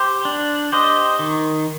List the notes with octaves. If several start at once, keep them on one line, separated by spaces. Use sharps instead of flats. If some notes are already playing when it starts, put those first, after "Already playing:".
Already playing: G4 C5
D4
G4 C5 D#5
D#3